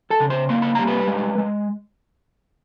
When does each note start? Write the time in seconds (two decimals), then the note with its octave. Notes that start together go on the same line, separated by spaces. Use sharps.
0.10 A4 A5
0.20 C#3
0.30 C5 C6
0.49 A#3 C6
0.62 B5
0.75 G3 A#5
0.87 B4 B5
1.08 G#3
1.38 G#3